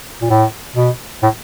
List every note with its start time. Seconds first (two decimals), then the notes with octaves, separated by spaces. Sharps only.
0.21 A#2
0.30 A2
0.76 B2
1.23 A2